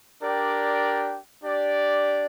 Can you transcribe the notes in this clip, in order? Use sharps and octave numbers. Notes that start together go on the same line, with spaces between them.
D4 G4 A#4 D5 G5
D4 G4 D5